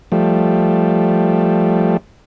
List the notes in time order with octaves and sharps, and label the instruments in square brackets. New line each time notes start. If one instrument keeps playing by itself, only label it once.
[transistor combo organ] F3 G3 A3